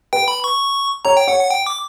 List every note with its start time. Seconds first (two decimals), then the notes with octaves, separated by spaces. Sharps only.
0.13 B4 G5
0.28 B5
0.44 C#6
1.05 C#5 A#5
1.17 G5
1.28 C#5 F#5
1.39 F#5
1.51 G5
1.66 D6